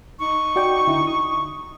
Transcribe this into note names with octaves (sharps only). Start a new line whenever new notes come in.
D#4 C#6
F#4 D5 G5
D3 E4
D#6